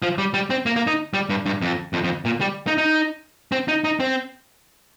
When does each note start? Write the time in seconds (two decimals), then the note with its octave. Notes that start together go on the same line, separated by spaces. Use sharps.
0.02 F3
0.18 G3
0.34 G3
0.50 C4
0.66 A#3
0.76 A#3
0.87 D#4
1.14 G3
1.29 G2
1.46 G2
1.62 F2
1.93 F2
2.04 F2
2.25 A#2
2.41 G3
2.67 D#4
2.78 D#4
3.52 C4
3.68 D#4
3.84 D#4
4.00 C4